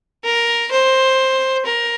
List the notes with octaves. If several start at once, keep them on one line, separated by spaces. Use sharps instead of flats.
A#4
C5
A#4